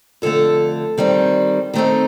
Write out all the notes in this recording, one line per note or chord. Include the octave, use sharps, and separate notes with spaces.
F2 D3 A3 A4
D#3 G3 C4
D#3 A3 C4 D#4